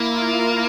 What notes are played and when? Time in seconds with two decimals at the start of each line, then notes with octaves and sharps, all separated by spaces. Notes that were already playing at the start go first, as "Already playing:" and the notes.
Already playing: A#3 E4
0.15 F4
0.38 A#4